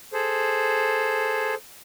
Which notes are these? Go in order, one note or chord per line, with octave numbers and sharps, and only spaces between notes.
G#4 A4 C5